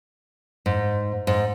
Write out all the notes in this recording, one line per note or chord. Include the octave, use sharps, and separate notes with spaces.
G#2
G#2